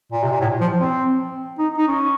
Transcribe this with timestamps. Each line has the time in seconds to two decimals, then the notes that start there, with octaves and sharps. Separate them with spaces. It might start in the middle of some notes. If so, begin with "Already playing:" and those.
0.12 A#2
0.23 C3
0.32 A#2
0.40 A2
0.61 F3
0.80 C4
1.58 D#4
1.78 D#4
1.88 C#4